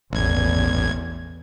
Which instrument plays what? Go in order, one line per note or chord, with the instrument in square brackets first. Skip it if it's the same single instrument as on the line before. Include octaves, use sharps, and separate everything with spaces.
[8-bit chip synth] A1 G#6 [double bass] E2